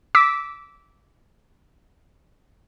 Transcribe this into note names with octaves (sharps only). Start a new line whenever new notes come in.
D6 E6 B6